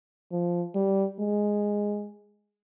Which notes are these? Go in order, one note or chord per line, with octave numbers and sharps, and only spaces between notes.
F3
G3
G#3